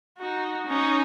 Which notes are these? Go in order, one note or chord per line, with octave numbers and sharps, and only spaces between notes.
D#4 F#4
C#4 D#4